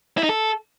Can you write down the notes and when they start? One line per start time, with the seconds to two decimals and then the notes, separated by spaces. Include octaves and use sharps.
0.18 E4
0.23 D#4
0.29 A4